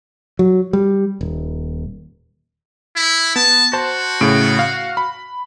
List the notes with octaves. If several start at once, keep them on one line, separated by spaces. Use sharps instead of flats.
F#3
G3
D#1
E4
B3 A5
F#4 C5 A5
A2 C#3 D7
F5
B5